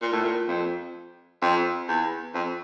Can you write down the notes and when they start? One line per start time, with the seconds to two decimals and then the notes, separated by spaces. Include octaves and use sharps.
0.02 A#2
0.12 A2
0.24 A#2
0.48 F2
1.42 F2
1.88 E2
2.34 F2